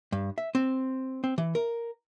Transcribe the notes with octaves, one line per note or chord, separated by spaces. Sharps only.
G2
E5
C4
C4
E3
A#4